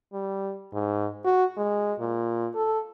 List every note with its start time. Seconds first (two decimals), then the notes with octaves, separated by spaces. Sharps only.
0.13 G3
0.73 G#2
1.24 F#4
1.57 G#3
2.00 A#2
2.55 A4